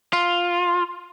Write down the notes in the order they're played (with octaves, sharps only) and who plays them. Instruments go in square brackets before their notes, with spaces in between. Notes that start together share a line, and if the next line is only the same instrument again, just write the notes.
[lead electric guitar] F4